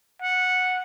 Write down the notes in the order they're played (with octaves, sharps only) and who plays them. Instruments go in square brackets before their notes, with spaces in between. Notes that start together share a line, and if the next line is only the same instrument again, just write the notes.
[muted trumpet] F#5